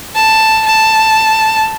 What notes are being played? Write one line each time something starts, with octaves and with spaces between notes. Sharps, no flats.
A5
A5